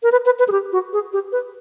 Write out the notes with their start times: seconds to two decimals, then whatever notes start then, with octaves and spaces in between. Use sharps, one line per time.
0.03 A#4
0.12 B4
0.26 B4
0.39 B4
0.48 G#4
0.52 G4
0.73 F#4
0.93 G#4
1.13 G4
1.32 B4